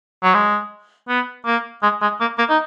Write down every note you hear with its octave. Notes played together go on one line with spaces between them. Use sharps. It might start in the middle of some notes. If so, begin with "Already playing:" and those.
F#3
G#3
B3
A#3
G#3
G#3
A#3
A#3
D#4